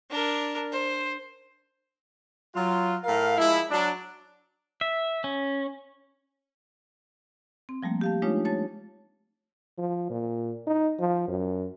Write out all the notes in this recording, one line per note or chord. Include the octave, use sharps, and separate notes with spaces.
D4 A#4
C5
F#3 F4
A2 A#4 F5
F3 G#3 E4
F#3 D4
E5
C#4
C4
F3 G3 A3 A#3
G4 F5 A5
G#3 A3 D4 D#4 F4 C#5
C#5 A5 A6
F3
A#2
D#4
F3
F#2